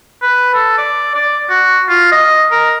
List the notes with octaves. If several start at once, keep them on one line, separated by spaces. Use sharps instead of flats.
B4
A4
D5
D5
F#4
F4
D#5
A#4